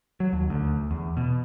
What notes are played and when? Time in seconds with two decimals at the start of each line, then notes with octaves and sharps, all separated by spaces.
0.20 F#3
0.33 D#2
0.50 D2
0.91 E2
1.17 B2